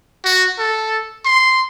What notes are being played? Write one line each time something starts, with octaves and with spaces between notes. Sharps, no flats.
F#4
A4
C6